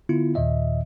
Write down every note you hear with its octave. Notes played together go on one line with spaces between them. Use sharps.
D3 B3 E4 F4
D#2 A#2 D#3 D#5 E5